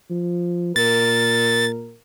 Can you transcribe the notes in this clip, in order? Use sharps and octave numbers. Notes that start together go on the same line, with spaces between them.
F3
A#2 A#4 A6